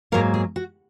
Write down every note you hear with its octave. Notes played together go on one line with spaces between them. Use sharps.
G#2 F#3 A#3 A#4
G#4
F#4